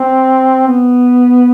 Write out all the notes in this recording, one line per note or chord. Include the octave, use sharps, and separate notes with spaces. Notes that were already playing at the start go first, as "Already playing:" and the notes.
Already playing: C4
B3